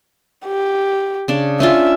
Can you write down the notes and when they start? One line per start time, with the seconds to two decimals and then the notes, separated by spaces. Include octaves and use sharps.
0.46 G4
1.28 C#3 D4
1.60 C#4 D4 F4 E5